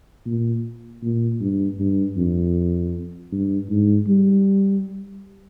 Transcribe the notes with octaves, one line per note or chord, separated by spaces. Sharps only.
A#2
A#2
G2
G2
F2
G2
G#2
G3